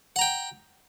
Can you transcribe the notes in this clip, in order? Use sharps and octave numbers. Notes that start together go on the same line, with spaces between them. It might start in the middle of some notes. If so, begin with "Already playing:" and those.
F#5 G5 A#5